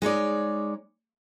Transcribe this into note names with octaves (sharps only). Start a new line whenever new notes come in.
G#3 D#4 C#5 D5